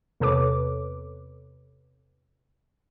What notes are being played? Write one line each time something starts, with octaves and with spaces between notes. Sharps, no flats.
E2 C3 A4 B4 C#5 D6